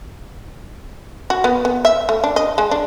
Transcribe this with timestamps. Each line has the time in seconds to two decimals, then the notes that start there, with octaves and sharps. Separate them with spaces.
1.30 F#4
1.44 B3
1.65 B3
1.85 E5
2.09 A3
2.24 D4
2.36 D#5
2.58 G#3
2.71 D4